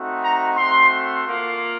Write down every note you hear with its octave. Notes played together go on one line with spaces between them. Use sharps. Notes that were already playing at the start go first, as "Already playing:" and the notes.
Already playing: A3 C4 D#4 F#4
A#5
A3 C4 F#4 C6
A#3 F4